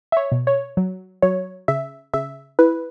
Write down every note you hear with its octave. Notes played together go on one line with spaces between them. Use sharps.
E5
C#5
B2
C#5
F#3
F#3 C#5
C#3 E5
C#3 E5
E4 B4